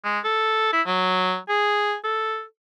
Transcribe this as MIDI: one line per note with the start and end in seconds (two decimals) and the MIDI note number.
0.04 0.19 56
0.25 0.72 69
0.73 0.82 64
0.87 1.37 54
1.49 1.95 68
2.04 2.43 69